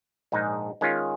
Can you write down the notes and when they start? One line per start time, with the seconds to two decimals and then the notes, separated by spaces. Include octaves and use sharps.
0.32 A#1 G#2 G#3 D#4
0.81 D#3 G#3 C#4 F4